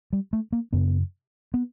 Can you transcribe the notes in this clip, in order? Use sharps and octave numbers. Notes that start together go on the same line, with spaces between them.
G3
A3
A#3
F#2 C#3 B3
B3